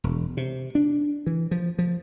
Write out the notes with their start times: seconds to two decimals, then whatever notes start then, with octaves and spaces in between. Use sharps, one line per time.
0.04 E1
0.37 C3
0.75 D4
1.26 E3
1.51 F3
1.79 F3